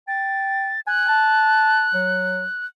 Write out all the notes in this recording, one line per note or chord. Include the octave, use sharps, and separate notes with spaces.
G5 A6
G#5 F#6
A5
F#3